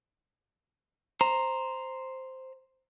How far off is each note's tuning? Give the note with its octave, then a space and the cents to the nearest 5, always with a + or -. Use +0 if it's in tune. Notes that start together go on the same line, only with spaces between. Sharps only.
C5 +0 A#5 +0